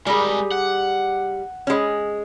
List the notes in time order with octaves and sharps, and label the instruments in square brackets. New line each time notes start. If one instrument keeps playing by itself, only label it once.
[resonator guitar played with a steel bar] G3 G#4 [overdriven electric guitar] G#3 A#4
[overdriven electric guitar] F#5
[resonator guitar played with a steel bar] G#3 C#4